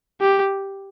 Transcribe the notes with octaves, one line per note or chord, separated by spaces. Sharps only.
G4